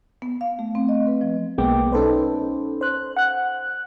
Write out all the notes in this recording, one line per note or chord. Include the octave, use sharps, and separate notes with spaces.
B3
F5
A3
C4
D#5
B4
F3
B1 G#3 A#3 B3 G5 D6
C#4 D#4 A4 B4 C5
C5 F#6
F#5 F#6